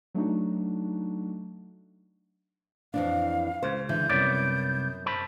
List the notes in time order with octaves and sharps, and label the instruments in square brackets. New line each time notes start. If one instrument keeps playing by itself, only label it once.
[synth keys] F#3 A3 D4 D#4 F#4
[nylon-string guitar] F2 E3 D4 [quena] F5
[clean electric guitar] C#2 C#3 [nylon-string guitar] C5
[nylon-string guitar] D3 E3 [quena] G6
[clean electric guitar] C2 B3 D5 [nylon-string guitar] F#2
[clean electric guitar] C5 A5 B5